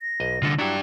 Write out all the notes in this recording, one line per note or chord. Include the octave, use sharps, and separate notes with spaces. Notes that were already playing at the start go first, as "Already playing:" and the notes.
A#6
B1 D#5
C2 D3 F4 A4
F#3 D4 E4 F#4 G4